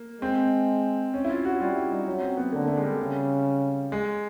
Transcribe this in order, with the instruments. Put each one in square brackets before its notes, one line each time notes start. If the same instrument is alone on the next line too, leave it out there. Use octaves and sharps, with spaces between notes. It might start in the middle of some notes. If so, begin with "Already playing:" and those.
Already playing: [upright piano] A#3
[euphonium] G#3 [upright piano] C4
[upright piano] C#4
E4
F4
F#4
[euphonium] G3 [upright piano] F4
[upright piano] E4
D#4
[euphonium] F#3 [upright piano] C#4
[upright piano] C4
B3
[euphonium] D3 [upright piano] A#3
[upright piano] A3
G#3
G3
[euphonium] C#3
[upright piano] G#3